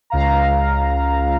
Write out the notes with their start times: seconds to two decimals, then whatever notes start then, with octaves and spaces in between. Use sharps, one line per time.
0.10 C#2 F5 A#5